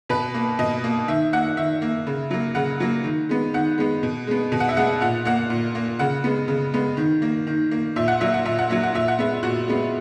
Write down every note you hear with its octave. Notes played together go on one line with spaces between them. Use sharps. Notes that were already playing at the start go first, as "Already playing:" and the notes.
B2 B4
A#3
B2 D#5
A#3
D#3 E5
A#3 F#5
D#3 E5
A#3
C#3
F#3 A#3
C#3 F#5
F#3 A#3
D#3
G#3 B3
D#3 F#5
G#3 B3
B2
G#3 B3
B2
F#5
E5
G#3 B3 F#5
A#2 F#5
A#3 F#5
A#2
A#3
C#3 F#5
G#3 B3
C#3
G#3 B3
D#3
A#3
D#3
A#3
A#2 E5
F#5
F#3 A#3 E5
F#5
A#2 E5
F#5
F#3 A#3 E5
F#5
A#2 E5
F#5
G#3 B3 E5
A#2 F#4
G#3 B3